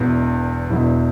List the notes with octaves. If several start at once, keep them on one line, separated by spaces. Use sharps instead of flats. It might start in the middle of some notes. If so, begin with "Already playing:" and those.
Already playing: E1 E2 E3
E1 E2 E3